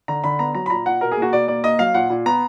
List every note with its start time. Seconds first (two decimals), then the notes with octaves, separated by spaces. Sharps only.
0.08 D3 A#5
0.24 D3 B5
0.39 B3 A#5
0.55 F#3 A#5
0.66 B5
0.70 A#2 A#5
0.86 A#2 F#5
1.01 B2 A#4
1.12 G#4
1.17 A#3
1.22 F#4
1.33 B2 D5
1.48 A#3 D5
1.63 A#3 D#5
1.79 F#3 F5
1.94 A#2 F#5
2.10 A#2
2.26 B3 A#5